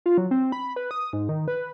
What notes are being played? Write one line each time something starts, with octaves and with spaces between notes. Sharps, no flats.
F4
F#3
C4
B5
B4
D#6
G#2
D#3
B4